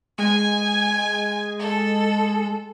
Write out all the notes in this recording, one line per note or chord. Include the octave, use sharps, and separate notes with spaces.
G#3 G#5
A4